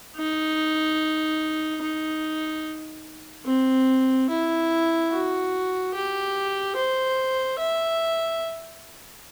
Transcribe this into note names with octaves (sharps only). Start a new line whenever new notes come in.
D#4
D#4
C4
E4
F#4
G4
C5
E5